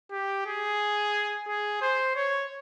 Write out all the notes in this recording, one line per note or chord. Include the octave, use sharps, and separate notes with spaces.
G4
G#4
G#4
C5
C#5